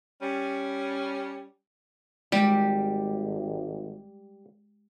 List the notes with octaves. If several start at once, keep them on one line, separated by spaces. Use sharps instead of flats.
G3 C#4
G#1 G3 G#3 G4